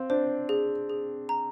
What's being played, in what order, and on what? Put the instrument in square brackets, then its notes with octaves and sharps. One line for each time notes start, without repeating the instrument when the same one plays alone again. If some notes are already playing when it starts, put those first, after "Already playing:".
Already playing: [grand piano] C4 [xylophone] F5
[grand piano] D4 [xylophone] C5
[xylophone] G#4
G#4
A#5